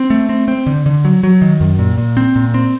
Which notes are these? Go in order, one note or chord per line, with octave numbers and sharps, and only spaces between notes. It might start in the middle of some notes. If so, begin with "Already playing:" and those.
Already playing: C4
A3
C4
C4
D3
D3
F#3
F#3
D#3
F#2
A#2
A#2
C4
A#2
C4